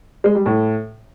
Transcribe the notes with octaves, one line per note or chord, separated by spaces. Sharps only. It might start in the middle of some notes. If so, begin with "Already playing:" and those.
G#3
G3
A2